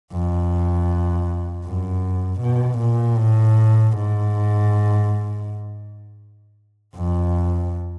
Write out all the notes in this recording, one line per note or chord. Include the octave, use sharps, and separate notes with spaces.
F2
F#2
B2
A#2
A2
G#2
F2